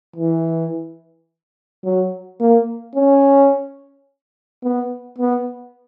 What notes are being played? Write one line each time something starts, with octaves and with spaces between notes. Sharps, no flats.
E3
F#3
A#3
C#4
B3
B3